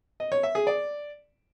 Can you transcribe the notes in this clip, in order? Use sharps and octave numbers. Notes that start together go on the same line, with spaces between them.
D#5
C#5
E5
G#4
D5